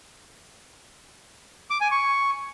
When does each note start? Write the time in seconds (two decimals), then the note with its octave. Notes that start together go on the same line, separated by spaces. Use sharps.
1.70 D6
1.81 G#5
1.91 C#6